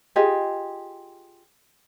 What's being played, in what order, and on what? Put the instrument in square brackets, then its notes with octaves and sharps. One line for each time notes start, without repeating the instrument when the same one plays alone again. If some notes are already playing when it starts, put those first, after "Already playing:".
[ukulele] F4 G4 G#4 D#5